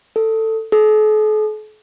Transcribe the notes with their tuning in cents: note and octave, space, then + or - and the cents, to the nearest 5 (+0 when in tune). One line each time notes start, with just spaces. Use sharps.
A4 +15
A4 -45